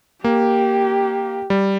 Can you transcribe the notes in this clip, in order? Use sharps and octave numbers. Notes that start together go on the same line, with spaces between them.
A#3 G4
G3